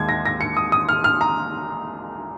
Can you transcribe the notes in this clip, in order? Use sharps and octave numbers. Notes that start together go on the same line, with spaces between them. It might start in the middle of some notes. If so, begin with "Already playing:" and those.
Already playing: D#2 D#3 G#3 G#6
A#6
A#6
C#7
D#6
D#6
F6
F6
A#5